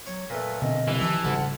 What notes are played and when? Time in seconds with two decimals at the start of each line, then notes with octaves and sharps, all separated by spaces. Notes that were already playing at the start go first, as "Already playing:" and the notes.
0.07 F#3 C#5
0.30 A#2 A3 B4
0.62 B2 D3 C4 D#5
0.88 C2 E3
1.01 D#3 F3 G4 E5 A5 B5
1.24 G#1 D2 C#3 G3 F#5 A5